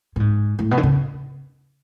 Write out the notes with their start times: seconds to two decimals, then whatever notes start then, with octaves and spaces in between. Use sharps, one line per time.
0.16 A2
0.20 G#2
0.59 A2
0.71 B2
0.77 D3
0.83 C#3